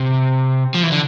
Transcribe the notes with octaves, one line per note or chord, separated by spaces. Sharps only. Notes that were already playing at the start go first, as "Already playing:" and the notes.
Already playing: C3
F3
E3
D3